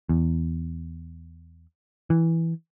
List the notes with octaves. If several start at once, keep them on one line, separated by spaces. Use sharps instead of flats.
E2
E3